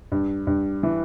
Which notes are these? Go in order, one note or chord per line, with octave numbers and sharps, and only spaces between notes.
G2
G2
E3